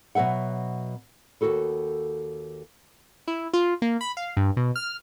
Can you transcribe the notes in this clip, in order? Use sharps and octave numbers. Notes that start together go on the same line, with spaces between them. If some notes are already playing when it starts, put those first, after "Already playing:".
B2 F#3 B4 E5 F#5
D#2 B2 F#4 A4 B4
E4
F4
A#3
B5
F5
G2
B2
F6